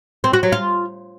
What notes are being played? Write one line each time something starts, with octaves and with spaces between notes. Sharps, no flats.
C4
F#4
F#3
F4